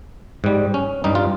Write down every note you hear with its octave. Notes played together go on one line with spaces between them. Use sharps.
G#2 G3
C#4
G2 G3 D#4
F4